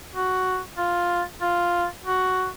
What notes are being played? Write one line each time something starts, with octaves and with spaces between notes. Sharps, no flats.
F#4
F4
F4
F#4